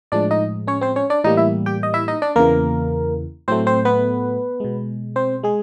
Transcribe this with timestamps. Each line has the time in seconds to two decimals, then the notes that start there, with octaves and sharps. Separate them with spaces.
0.12 A2 F3 G#3 D4 D5
0.31 D#4 D#5
0.67 C#4 C#5
0.81 C4 C5
0.96 C#4 C#5
1.10 D4 D5
1.24 A2 E3 G3 A#3 D#4 D#5
1.37 E4 E5
1.66 G4 G5
1.83 D#5
1.94 E4 E5
2.08 D#4 D#5
2.22 D4 D5
2.36 E2 C#3 E3 A#3 A#4
3.48 A2 F#3 A3 C4 C5
3.66 C4 C5
3.85 B3 B4
4.60 B2 G#3
5.16 C4 C5
5.43 G#3 G#4